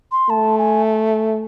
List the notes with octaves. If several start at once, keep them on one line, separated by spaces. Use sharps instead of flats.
C6
A3 A5
G#5